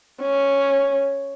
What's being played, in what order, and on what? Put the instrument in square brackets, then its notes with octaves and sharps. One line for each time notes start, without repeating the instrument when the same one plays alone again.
[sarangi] C#4